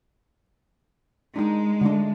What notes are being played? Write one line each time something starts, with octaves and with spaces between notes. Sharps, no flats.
G#3 D4 D#4
D3 A3 D4